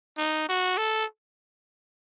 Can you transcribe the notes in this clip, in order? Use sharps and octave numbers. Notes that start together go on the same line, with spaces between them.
D#4
F#4
A4